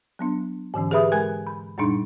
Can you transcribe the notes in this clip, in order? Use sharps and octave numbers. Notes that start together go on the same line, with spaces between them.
F#3 B3 D4
G#2 D3 E3 C#4
G4 G#4 B4 E5 B5 D#6
G#3 A#4 G#5 F#6 G#6
B5
F#2 A#2 G3 D4 D#4